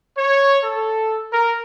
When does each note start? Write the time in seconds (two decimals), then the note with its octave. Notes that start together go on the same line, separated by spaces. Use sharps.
0.16 C#5
0.63 A4
1.32 A#4